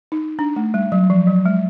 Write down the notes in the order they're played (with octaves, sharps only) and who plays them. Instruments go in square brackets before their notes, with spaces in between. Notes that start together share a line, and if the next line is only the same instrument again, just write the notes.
[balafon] D#4
D4
A3
G3
F#3
F3
F#3
G#3